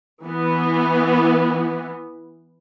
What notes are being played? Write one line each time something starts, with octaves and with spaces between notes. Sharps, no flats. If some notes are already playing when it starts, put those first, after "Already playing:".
E3 B3